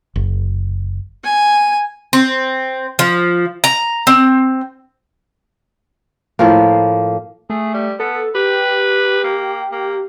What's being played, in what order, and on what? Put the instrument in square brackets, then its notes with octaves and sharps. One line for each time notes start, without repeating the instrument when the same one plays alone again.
[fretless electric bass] F#1
[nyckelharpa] G#5
[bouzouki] C4
F3
A#5
C4
[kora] A2 F3 A#3
[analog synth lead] A3 [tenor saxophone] G#4
[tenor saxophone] G3
[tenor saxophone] B3 [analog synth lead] A4
[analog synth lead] G4 [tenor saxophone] B4
[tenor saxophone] A#3
A#3